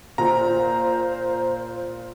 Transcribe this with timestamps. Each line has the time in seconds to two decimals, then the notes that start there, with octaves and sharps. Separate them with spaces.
0.18 A#2 C5 A#5